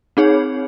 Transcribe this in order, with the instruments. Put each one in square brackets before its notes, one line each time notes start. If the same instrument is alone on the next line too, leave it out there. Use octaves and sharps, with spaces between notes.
[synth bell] C4 D#4 G#4 C#5